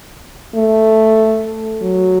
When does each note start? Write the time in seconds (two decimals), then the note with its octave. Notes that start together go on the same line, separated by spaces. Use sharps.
0.55 A3
1.81 F#3